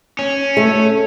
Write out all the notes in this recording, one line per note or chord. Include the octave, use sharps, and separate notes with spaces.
C#4
A3